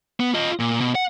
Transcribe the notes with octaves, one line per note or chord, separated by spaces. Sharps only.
B3
F4 D#5
A#2
B2
F#5